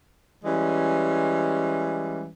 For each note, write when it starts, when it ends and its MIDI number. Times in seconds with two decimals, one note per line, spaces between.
0.44 2.27 52
0.44 2.27 55
0.44 2.27 56
0.44 2.27 61